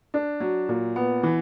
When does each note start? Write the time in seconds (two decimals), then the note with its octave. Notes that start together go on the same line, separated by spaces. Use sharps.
0.14 D4
0.40 F#3
0.69 A#2
0.96 B3
1.23 E3